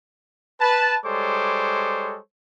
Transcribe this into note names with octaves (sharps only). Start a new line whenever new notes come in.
B4 A5
G3 G#3 A4 C5 C#5 D6